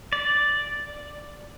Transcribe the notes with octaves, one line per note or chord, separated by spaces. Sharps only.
D5